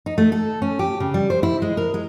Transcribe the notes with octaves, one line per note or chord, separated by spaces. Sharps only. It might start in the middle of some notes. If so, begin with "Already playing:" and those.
D#4
A3
A4
C#4
G4
C#3
G3
C5
E4
G#3
A#4
G#3